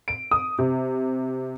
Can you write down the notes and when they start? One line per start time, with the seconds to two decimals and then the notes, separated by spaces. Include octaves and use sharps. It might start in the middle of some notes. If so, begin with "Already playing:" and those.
0.08 D7
0.31 D#6
0.59 C3